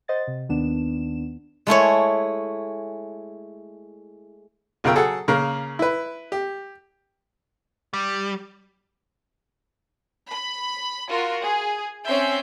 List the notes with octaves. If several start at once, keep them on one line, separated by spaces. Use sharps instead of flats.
C5 D#5 F#5 A6
C3
D#2 D#3 B3 D4 E7
G#3 A3 E4 C#5
B1 C#3 F4 A#4 G5 E6
F#3 G#4 A4 F#5
C#3 A#3 A#4
E4 B4
G4
G3
B5
F4 F#4 A#4
G#4
C4 C#4 E5 G6 C7